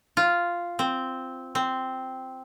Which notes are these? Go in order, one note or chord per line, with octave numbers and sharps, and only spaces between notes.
F4
C4
C4